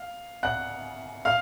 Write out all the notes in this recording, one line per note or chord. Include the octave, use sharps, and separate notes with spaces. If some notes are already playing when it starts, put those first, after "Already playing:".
Already playing: F5
F#5 F#6
F5 F6